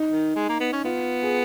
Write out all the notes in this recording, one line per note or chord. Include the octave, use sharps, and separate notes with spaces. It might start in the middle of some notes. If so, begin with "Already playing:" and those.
Already playing: D#4
D#3
G#3
A#3
B3
C#4
B3 F4
G#4